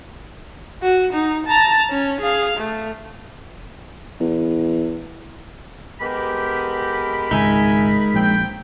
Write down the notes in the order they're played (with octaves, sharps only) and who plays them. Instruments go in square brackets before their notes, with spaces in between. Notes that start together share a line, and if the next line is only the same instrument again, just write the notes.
[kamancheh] F#4
D#4
A5 A#5
C#4
G#4 F5
A3
[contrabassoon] E2
[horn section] G#3 B3 G4 [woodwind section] A#4 B5
[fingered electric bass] G#1 C#2 [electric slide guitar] G#3 D#4 [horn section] E5 G#5
[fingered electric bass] A#1 [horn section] C4 G5